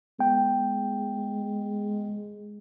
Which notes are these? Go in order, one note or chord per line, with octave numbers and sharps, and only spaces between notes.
G#3 B3 G5